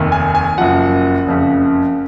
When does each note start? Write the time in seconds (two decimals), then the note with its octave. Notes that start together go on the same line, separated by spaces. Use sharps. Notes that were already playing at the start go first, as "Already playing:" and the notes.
Already playing: F1 D#2 D#3
0.12 G#5
0.35 G#5
0.58 F#1 F#2 F3 F#5
1.26 F#1 F2 C#3